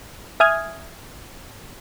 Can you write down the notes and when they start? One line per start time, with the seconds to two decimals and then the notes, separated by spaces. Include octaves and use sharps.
0.40 E5 G#5 D#6 F6 G#6